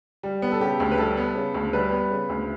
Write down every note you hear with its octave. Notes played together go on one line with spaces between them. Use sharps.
G3
B3
A4
C#3 G4
D2
B4
G3 A4
B3
C#3
D2
G3 B4
B3
C#3
D2